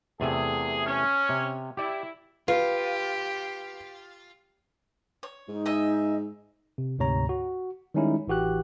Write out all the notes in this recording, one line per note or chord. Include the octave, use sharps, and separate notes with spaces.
E2 C3 A3 G#4
C#4
C3
E4 G4 D5
F4 G4 B4
C#5
G#2 D#4
D#5 E5 G#5
C3
D2 G#2 C3 C#5 A#5
F#4
D#3 G3 G#3 C#4 D#4 E4
A1 E3 F#4 G4 F#6